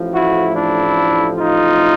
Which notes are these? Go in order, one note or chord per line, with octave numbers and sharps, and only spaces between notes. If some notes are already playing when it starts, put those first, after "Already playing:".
Already playing: A1 A2 F3
E4 F#4
D4 E4
D#4 F4